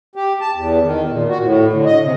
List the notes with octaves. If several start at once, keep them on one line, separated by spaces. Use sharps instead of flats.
G4
A5
E2
D#3
A#2
F#4
A2
D3
D#5
C3